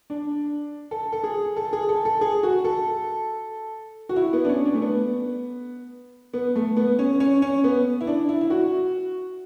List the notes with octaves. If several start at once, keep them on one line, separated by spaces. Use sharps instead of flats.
D4
A4
A4
G#4
A4
G#4
A4
A4
G#4
F#4
A4
F#4
E4
B3
D4
C#4
D4
A3
B3
B3
A3
B3
C#4
C#4
C#4
B3
E4
D4
E4
E4
F#4